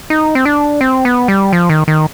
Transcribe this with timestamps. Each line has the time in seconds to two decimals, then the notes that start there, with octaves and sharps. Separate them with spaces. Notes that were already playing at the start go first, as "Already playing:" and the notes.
0.10 D#4
0.35 C4
0.45 D4
0.81 C4
1.05 B3
1.28 G3
1.53 F3
1.70 D#3
1.88 D#3